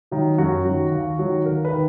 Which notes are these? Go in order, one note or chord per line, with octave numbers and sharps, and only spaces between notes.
D#3 F#3
F#2 F#4
D#3 F#3
D#2
D#3 F#3
D#2 A#4
B4
D#3